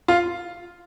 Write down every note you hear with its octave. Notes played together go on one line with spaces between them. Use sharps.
F4